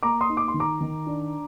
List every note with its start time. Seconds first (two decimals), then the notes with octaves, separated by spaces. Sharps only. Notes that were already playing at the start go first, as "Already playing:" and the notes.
0.03 A#3 A#5 D6
0.21 C6 D#6
0.29 D#4
0.37 D6
0.48 C6
0.54 D#3
0.60 A#5 D6
0.81 D#3
1.06 D4